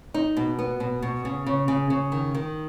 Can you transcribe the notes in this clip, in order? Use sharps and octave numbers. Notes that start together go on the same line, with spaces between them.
D#4
B2
B3
B2
B2
C#3
C#3
C#3
C#3
D#3
D#3